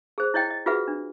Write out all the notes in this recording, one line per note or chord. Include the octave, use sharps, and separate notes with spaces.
G#4 C5
E4 C#5 D#5 G5
D#5
F4 F#4 G#4 B4 E5 F#5
D4